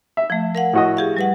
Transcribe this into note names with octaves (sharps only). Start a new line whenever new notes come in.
E5
F3 A3
A#4 F5 F#5
A2 F#4 D#5
G4 G#4 F5
G3 B4 F#5